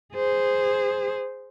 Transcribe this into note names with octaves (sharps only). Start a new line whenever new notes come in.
G#4 C5